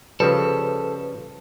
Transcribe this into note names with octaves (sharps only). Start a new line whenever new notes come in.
C#3 F3 G3 A4 B4